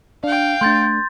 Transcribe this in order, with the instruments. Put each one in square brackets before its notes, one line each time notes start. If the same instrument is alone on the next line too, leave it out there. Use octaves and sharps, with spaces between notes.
[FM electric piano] D4 [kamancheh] F5 G5
[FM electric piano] A3 D4 [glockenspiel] C6 G6 A6